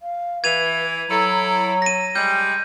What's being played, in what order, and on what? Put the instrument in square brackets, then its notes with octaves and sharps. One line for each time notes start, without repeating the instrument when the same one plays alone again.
[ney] F5
[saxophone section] E3 [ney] B4 [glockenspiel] G#6 D#7 F7
[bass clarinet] F#3 [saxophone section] E4 A4 [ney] A#5
[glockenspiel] A#6 D#7
[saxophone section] G3 G#3 [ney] G5 [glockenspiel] G6